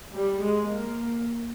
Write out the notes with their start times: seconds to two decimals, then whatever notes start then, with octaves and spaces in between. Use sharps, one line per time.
0.13 G3
0.41 G#3
0.69 A#3